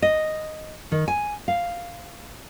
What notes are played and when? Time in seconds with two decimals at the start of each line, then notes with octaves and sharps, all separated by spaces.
0.02 D#5
0.92 D#3
1.08 G#5
1.48 F5